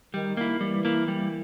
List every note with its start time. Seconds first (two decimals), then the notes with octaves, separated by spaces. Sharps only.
0.14 D#3 G3
0.37 A#3 E4
0.61 E3 G3
0.85 A#3 E4
1.08 G3